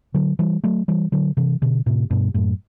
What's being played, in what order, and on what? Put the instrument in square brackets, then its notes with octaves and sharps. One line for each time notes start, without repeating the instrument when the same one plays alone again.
[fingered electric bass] D3 F#3
E3 G3
F#3 A3
E3 G3
D3 F#3
C3 E3
B2 D3
A2 C3
G2 B2
F#2 A2